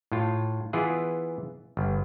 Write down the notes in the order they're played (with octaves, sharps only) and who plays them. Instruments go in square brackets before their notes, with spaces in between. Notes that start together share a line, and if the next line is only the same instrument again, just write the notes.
[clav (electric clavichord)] A2 F4
E3 B3 E4 F4 G#4
G1